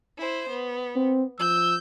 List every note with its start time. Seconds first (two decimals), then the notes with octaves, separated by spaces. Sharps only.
0.18 E4 C5
0.49 B3
0.96 C4
1.40 F3 E6 G6